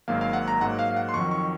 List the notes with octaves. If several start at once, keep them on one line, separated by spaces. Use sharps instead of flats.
G#1 G#2 F#3 A#3 F5
F5
F#5
A#5
G#2 F#3 A#3 F#5
F5
F5
F#5
C6
F2 D#3 F#3 C#6
C#6